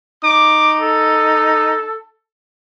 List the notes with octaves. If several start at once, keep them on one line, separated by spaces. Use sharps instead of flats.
D#4 D6
A4